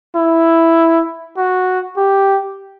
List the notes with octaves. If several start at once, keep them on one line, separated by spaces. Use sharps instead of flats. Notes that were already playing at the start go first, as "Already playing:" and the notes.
E4
F#4
G4